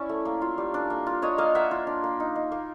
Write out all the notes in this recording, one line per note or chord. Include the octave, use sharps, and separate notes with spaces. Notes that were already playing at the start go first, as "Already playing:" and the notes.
Already playing: C#4 E4 D5 E5
A3
A#3
F4
G3
D4
A#3
F4
D4 C#5 D#5
A#3 D#5 F5
A#3 E5 F#5
F4
D4
A#3
D#4
D#4
A#3